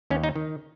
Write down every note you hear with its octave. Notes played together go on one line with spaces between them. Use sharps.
D#2 C#4
D#4
D#3